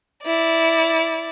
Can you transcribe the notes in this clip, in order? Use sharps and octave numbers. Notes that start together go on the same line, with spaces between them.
E4 D5